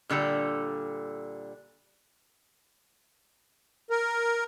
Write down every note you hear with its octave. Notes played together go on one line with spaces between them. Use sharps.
A#2 D3 G3 A4
A#4